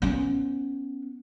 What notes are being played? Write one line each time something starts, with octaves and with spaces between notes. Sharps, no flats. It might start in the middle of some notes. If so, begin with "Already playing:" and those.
B3 C#4